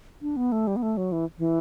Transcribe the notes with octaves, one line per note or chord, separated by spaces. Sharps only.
D4
B3
A3
G3
B3
A3
F#3
E3
E3